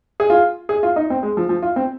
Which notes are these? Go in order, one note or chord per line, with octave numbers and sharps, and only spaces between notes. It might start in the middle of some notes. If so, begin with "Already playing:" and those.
G#4
F4
G#4
F4
D#4
C4
G#3
F3
F3
F4
C4